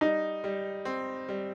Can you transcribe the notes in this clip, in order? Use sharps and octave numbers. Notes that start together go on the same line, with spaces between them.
G3 D#4
G3
C4
G3